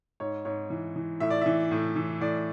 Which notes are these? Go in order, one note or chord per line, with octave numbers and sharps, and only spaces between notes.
G#2 C#5
G#2 C#5
E3
E3
A2 E5
D5
E3 E5
A2
E3
A2 D5